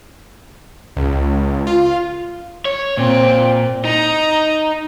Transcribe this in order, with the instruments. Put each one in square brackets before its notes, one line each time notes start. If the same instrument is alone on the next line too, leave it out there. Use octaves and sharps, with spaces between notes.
[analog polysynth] C#2
F4
[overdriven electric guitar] C#5
[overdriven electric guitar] A#2 [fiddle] C4
[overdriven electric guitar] D#4 [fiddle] A#5